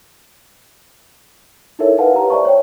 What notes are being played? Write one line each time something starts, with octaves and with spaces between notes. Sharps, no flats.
D#4 E4 A4 A#4 C#5 E5
A#4 B4 F5 F#5 G#5 A5
G4 A#5
C5 D5 E5 A5 C#6
C#5 G5